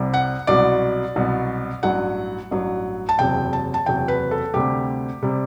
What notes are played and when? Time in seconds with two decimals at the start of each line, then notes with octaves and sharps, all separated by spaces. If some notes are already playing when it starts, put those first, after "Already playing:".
Already playing: C2 C3 G3
0.14 F#5
0.47 C2 B2 F#3 D5
1.16 C2 B2 F#3
1.83 A1 G2 F#3 F#5
2.51 A1 G2 F#3
3.09 A5
3.18 F#1 E2 C3 F#3 G5
3.53 A5
3.74 A5
3.86 F#1 E2 C3 F#3 G5
4.08 B4
4.31 A4
4.54 D2 C3 G3 G4
5.22 C3 G3